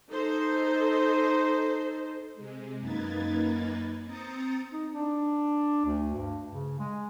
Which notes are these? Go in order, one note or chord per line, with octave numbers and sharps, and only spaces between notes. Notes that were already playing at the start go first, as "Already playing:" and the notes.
D#4 A4 C5
C3 G#3
F#2 A#3 D#4 B4 G#6 A6
C4 A#5 D#6 A6 C#7
D#4
D4
D2
G2
C#3
G#3